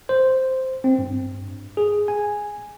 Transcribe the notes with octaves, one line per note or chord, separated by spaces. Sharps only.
C5
C4
G2
G#4
G#5